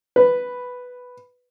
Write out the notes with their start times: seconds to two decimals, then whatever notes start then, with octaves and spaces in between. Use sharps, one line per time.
0.16 B4